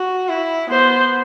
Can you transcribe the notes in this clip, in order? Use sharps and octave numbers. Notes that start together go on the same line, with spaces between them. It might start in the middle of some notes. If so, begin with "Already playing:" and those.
Already playing: F#4
E4
B3 C5